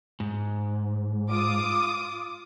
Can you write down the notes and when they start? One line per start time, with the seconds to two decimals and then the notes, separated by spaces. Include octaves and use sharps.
0.20 G#2
1.28 F4 D6 D#6